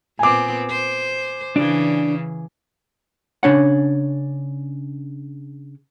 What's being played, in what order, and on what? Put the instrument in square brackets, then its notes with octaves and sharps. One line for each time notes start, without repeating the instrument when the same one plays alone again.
[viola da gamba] A#2 B3 C4 [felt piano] G#5 D6
[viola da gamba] C5
[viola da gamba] C#3 E3 [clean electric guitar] D4 D5
[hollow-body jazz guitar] C#3 D4 C#5 F#5